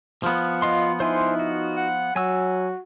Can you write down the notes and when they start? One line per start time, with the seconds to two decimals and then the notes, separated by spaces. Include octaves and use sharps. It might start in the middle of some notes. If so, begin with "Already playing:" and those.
0.23 F3 B3
0.62 F4 D#5 F5 C6
1.00 D#4 E4 C5 G#5 C6
1.39 F#4
1.76 F#5
2.16 F#3 F#4 G#5 E6